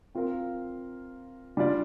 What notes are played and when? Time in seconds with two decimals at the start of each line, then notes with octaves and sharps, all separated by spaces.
0.15 C4 F4 A#4 F5
1.57 G3 D4 F4 D5 F5